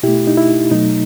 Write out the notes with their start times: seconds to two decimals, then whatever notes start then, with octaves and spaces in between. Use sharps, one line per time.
0.03 B2 A3 E4 G4
0.27 D#4
0.37 E4
0.71 B2 F#3 A3 D#4